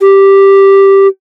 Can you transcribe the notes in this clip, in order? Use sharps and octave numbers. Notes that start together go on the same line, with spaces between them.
G4